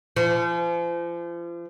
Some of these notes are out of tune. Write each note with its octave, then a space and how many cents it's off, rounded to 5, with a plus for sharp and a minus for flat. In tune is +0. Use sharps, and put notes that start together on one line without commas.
F3 -35